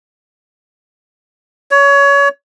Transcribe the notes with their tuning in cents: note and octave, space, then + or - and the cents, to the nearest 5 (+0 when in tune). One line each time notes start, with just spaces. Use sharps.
C#5 +25